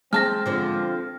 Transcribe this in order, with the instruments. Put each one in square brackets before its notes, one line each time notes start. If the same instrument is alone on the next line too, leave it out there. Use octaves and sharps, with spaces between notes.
[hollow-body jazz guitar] G#3 A5 [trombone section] C4 [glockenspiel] F6 A#6
[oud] D3 F3 B3